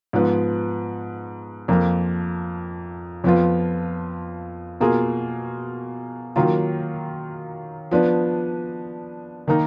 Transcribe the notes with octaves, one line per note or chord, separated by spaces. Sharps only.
G#2 F3 B3
F2 F3 A#3
F2 F3 B3 F4
B2 A#3 F4 G#4
D#3 F#3 A#3 F4
F3 B3 D4
D#3 A#3 D#4